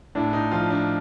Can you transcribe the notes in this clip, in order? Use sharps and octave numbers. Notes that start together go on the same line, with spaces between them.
A2 D4
D#4
F3 F4
D4